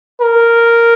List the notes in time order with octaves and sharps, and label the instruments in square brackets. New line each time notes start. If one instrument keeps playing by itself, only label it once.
[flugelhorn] A#4